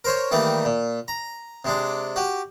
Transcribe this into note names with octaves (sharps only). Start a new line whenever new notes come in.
A#4 C5 C#5
D#3 E3 G3 A3 A#3
A#2
A#5
C3 G#3 D4
F#4 G4